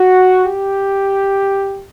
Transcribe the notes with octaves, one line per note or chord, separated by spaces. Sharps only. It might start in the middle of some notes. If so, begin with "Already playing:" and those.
Already playing: F#4
G4